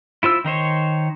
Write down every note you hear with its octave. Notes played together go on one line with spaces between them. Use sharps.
E4 F4 C5 E6
D#3 D#4 C5 C#5